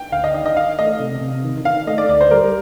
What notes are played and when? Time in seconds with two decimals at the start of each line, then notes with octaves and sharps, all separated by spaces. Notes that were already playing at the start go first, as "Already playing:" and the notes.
Already playing: G5
0.12 D2 F5
0.24 D#5
0.34 D#3 D#5
0.46 D#5
0.56 D#3 F5
0.79 A3 D#5
1.00 C3
1.21 C3
1.44 D#3
1.65 D#3 F5
1.87 A3 D#5
1.98 D5
2.09 D2 D5
2.21 C5
2.31 G3 A#4